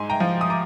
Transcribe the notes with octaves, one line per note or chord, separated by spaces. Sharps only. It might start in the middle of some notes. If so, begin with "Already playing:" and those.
Already playing: G#2 G#5 C6
G5 A#5
F3
D#6
A#5 D6